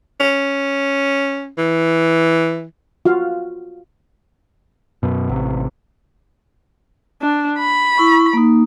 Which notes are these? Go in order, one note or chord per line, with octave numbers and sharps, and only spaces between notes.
C#4
E3
F4 F#4 F5
F#2 B2
A1 C3
D4
B5
E4 C#6
A#3 D#4